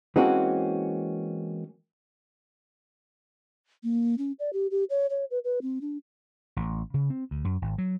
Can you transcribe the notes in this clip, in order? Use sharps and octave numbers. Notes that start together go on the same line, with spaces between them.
E3 G#3 A#3 C4 C#4 F#4
A#3
C#4
D5
G4
G4
C#5
C#5
B4
B4
C4
D4
A1
C#3
C4
D2
F#2
G#1
F#3